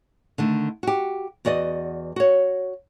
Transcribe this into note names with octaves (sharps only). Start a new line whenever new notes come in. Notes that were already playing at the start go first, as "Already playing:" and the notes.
D3 D#3 A3
F#4 G4
E2 F#4 D5 D#5
F#4 C#5